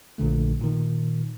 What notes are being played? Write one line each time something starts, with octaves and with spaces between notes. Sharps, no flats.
A#1 A#2 D3 A3
A#2 D#3